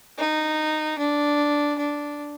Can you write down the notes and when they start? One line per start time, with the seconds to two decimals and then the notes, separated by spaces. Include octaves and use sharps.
0.18 D#4
0.98 D4
1.78 D4